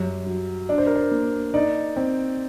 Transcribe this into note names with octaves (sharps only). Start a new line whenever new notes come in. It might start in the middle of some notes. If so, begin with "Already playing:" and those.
Already playing: F#2 G3
F#3
D4 D5
C5
A#4
C5
A#3
D#4 D5
C4